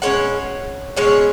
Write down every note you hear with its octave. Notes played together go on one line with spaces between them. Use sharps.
B2 G#3 C#4 C#5 F#5
B2 G#3 C#4 G#4 C#5